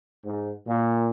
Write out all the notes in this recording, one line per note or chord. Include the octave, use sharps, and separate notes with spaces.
G#2
A#2